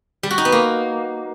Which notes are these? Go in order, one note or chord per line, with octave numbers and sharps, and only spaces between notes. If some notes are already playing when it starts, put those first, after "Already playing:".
G3
F#4
D#4
B3
A#3